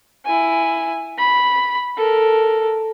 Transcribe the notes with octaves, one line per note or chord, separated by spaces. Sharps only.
E4 G#5
B5
A4 A#4